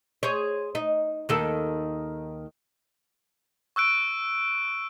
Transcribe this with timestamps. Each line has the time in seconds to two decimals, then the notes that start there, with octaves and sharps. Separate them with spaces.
0.23 G#4 C5 C#5
0.75 D#4
1.29 D#2 D#3 A4
3.76 C#6 E6 F#6 D7